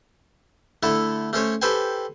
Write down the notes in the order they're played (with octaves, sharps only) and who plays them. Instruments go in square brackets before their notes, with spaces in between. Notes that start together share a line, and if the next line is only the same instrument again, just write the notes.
[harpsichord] D3 A3 E4 A4
A3 C#4 C5 C#5
G4 A4 B4 C5 G5 G#5